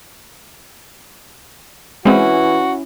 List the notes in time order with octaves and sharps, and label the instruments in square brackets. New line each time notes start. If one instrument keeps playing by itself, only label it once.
[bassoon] E3 [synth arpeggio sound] G#3 C4 [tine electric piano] C#4 E4 [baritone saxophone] F#4